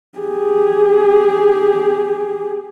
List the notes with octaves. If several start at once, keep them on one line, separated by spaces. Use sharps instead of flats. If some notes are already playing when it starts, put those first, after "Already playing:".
G4 G#4